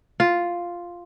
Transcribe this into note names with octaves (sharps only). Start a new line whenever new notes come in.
F4